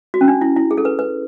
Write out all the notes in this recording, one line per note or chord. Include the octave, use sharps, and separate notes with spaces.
F#4
C#4
D4
E4
E4
G#4
A4
B4
B4